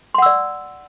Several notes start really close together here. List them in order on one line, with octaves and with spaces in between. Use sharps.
C6 F#5 E6 D5